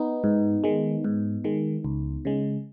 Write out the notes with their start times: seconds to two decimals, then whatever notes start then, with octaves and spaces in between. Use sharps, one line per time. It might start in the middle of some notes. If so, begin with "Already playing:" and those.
Already playing: B3 D#4
0.24 G#2
0.64 D#3 G#3
1.04 G#2
1.44 D#3 G#3
1.85 C#2
2.25 C#3 G#3